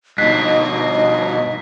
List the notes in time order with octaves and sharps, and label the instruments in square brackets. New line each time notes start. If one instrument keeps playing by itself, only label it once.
[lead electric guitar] G2 B2 [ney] D#4 [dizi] D#5 [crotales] F#6 B6 C7